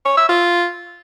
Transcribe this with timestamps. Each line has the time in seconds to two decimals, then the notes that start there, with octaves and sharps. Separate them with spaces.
0.05 C#5
0.17 E5
0.29 F4